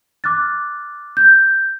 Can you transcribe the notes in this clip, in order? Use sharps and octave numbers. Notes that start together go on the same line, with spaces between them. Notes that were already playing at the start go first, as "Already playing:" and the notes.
D6 F6 F#6 A6
G6